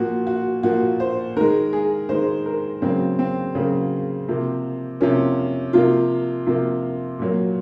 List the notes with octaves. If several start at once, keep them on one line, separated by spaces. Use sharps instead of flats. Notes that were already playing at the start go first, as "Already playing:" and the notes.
Already playing: A#2 F3 A#3 F#4
F#4
A#2 F3 A#3 F#4
C5
D#3 G#3 A#4
G#4
D#3 G#3 C5
A#4
C#3 F#3 A#3 C4
C4
C#3 F#3 A#3
C3 F3 A#3
C3 F3 A#3 C#4
C3 F3 A#3 F4
C3 F3 A#3
A#2 F#3 A#3